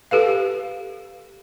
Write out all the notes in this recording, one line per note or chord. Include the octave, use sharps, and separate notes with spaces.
G4 A4 B4 F5